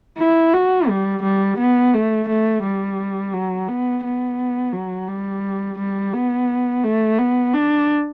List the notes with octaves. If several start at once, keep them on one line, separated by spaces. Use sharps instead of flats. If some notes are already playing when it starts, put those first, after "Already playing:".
E4
F#4
G3
G3
B3
A3
A3
G3
F#3
B3
B3
F#3
G3
G3
B3
A3
B3
D4